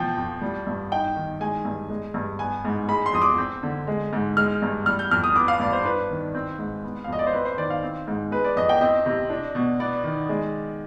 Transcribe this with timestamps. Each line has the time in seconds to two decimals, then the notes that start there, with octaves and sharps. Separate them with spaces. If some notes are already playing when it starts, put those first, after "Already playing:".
Already playing: B2 F3 G5
0.17 F2
0.41 G3
0.67 G2
0.91 D#4 G5
1.16 D#3
1.40 G#3 G#5
1.65 G2
1.90 G#3
2.14 G2
2.39 B3 G#5
2.65 G#2
2.88 G#3 B5
3.06 C6
3.13 F2 D#6
3.22 D6
3.38 C4
3.63 D3
3.87 G#3
4.13 G#2
4.37 G#3 F6
4.62 G2
4.86 G3 F6
4.99 G6
5.11 F2 F6
5.24 D#6
5.35 B3 D6
5.48 F5
5.60 G2 D5
5.73 C5
5.85 D4 B4
6.10 D#3
6.35 C4
6.58 G#2
6.84 B3
7.04 F5
7.08 F2 D#5
7.19 D5
7.26 C5
7.33 C4 B4
7.45 C5
7.57 D#3 D5
7.70 F5
7.83 C4
8.07 G#2
8.31 G#3 B4
8.44 D5
8.56 F2 D#5
8.69 G5
8.81 C4 D#5
9.06 C3
9.30 D4
9.55 B2
9.80 B3 D5
10.04 D#3
10.29 G#3